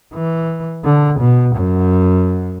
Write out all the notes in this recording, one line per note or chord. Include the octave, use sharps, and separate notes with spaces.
E3
D3
B2
F#2